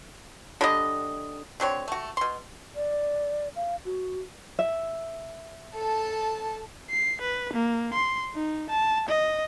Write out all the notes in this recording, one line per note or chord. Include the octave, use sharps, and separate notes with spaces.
D3 G3 D#5
D3 F#3 C4 C#5
A3 F#4
B2 C6
D5
F5
F#4
E5
A4 A5
C7
B4
A#3
C6
D#4
A5
D#5